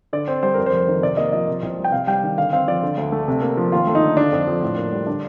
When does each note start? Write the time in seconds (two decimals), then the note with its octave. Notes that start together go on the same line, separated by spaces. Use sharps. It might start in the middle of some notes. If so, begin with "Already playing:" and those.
0.13 D3 D5
0.28 C4 C5
0.43 G3 C5
0.54 F2 A#4
0.66 C5
0.73 F1
0.88 D#3
1.02 C3 D5
1.17 A#3 D#5
1.32 F3 D#5
1.48 C3
1.62 C2
1.78 G3
1.84 G5
1.92 C3 F5
2.07 G3 G5
2.23 D#3
2.38 D3 F5
2.53 C4 F5
2.68 F3 D5
2.83 D3
2.98 D2
3.12 A3
3.28 C3
3.42 A#3
3.57 F3
3.72 D#2 F4
3.87 A3
3.95 D#4
4.03 D3
4.17 D3 D4
4.32 F2
4.47 F3
4.63 A2
4.77 A#3
4.92 G3
5.07 D3 D4